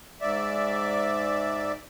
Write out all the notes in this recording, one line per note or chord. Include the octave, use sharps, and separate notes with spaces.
G#2 D5 E5